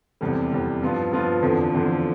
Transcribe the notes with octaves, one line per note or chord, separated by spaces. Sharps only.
F1 E2 C3 G3
F1 E2 C3 G3
G2 F3 B3 F4
G2 F3 B3 F4
F1 E2 D3 F3
F1 E2 D3 F3